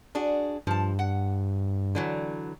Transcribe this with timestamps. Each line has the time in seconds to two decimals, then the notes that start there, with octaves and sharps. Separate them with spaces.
0.15 D4 F#4 G#4
0.67 G2 F3 A5
0.99 F#5
1.95 D3 E3 F#3